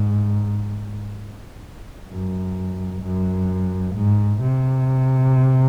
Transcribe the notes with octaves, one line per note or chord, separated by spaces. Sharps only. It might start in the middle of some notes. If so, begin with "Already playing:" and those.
Already playing: G#2
F#2
F#2
G#2
C3